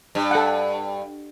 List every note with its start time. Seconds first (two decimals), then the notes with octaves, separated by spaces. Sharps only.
0.15 G2
0.31 A4 F#5